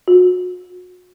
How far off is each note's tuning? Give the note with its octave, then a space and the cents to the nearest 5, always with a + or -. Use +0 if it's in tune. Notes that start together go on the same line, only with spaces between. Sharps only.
F#4 -40